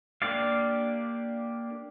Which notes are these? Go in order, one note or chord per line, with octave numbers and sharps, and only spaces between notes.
A#3 D4 G4 D5 F5